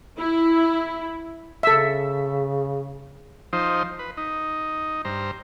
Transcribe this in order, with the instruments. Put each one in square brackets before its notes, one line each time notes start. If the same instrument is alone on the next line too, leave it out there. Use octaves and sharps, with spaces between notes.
[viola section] E4
[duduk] C#3 [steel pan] A4 E5
[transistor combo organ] F3 D#4 C5
B4
D#4
G2 C5 A#5